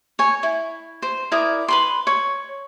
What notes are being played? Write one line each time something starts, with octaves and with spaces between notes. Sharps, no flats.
C#5 G#5
E4
C5
E4 A#4 D5 D#6
B4 B5 C6
C#5